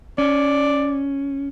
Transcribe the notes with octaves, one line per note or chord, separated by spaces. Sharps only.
C#4 D5